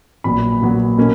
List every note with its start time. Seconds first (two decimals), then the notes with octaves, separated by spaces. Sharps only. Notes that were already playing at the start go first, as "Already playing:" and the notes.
0.24 A#1 A#2 F#3 B3 B5
0.62 A#1 A#2 F#3 B3
0.98 B2 A#3 C#4